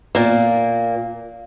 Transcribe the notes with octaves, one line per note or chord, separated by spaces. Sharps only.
A#2 A#3